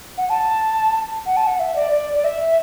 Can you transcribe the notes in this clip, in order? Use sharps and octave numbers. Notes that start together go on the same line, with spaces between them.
F#5
A5
F#5
A5
F#5
E5
D5
D5
D5
E5